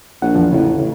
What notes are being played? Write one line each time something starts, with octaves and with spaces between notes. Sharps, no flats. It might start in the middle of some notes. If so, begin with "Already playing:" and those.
A#1 F#5
E2 F3
A1 C#3
A1 C#3